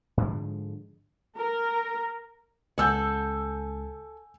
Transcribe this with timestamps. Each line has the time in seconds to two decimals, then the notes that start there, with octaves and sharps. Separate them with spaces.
0.17 G#2 D3 F3 G#3
1.39 A#4
2.78 C#2 A4 F#5 G#5 E6 G6